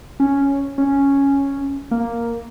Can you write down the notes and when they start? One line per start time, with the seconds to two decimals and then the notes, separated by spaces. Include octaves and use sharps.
0.20 C#4
0.78 C#4
1.91 A#3